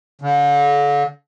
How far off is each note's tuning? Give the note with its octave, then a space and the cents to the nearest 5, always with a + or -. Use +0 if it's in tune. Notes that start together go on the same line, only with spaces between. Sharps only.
D3 -40